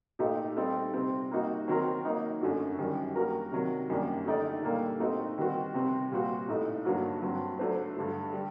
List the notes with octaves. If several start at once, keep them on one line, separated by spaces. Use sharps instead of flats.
A#2 A3 D#4 G4
G3 C4 D#4 A4
C3 G3 C4
G3 A#3 D#4 F#4
D#3 F#3 C4 F#4 A#4
F#3 A#3 D#4
F#2 D3 A3 D4 F#4
F#2 D#3 G3 D4
G3 A#3 F#4 A#4
C3 D#3 F#3
F#2 D#3 G3 A#3 D4
D3 A3 D#4 G4 D5
A#2 G3 A#3 D4 A4
A3 C4 D#4 F#4
D#3 G3 C4 F#4
C3 G3 C4
A#2 G3 C4 F#4
A2 A3 D#4
G2 D3 F#3 A#3 F#4
G2 F#3 C4
F#3 A3 D4 F#4 C5
G2 D3 A3
G3